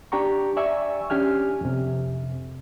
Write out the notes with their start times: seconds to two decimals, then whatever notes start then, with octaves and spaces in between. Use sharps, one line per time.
0.12 D4 G4 G5 A#5 C#6
0.57 D5 E5 G#5 C#6 E6
1.10 C#4 D4 G4 G#5 F6
1.61 F2 C3